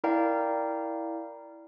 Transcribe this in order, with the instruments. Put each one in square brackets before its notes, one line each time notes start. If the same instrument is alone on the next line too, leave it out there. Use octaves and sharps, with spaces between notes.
[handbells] E4 A#4 D5 F5 G5 A#5